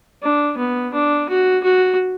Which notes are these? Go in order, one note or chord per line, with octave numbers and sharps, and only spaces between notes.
D4
B3
D4
F#4
F#4